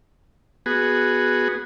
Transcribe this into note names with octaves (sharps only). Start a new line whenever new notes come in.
B3 F#4 G#4